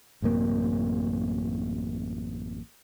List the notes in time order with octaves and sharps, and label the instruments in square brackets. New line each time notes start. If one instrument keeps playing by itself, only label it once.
[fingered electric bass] A1 F#2 C3 A#3